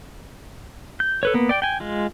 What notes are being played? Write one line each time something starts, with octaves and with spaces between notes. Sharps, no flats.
G6
A4 B4 C#5
A#3 B3
D5 G5
G5 G#5
G#3 F4